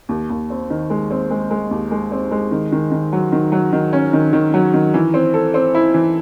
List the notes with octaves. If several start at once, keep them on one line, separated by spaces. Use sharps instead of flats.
D#2
D#2
C4
D#3
G#3
C4
G#3
G#3
D#2
G#3
C4
G#3
D#3
D#3
D#3
F#3
D#3
F#3
D#3
C#4
D#3
D#3
F#3
D#3
E3
C4
A4
C4
E4
E3